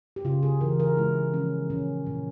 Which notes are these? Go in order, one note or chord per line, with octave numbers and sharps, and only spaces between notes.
G4
C#3 F4
G#4
E3 A#4
A#4
G#3 E4
F3 C#4
A#2 C#4
A#2